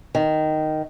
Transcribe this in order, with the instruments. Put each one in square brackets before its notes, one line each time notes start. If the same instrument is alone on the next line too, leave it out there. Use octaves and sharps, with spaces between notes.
[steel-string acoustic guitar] D#3